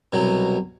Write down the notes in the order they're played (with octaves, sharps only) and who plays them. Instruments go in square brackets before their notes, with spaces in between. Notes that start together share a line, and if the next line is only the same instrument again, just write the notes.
[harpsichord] C2 B2 F#3